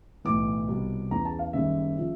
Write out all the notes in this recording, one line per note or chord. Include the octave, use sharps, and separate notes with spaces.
B1 A2 E3 D6
C2 B2 G3
E2 C#3 E3 A#5
A5
F5
F#1 F#2 D#3 G3 E5
C#3 F3